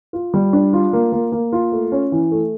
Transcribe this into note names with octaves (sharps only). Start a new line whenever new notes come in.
F4
G3
D4
F4
A#3
A#3
A#3
F4
A3
C#4
E3
A3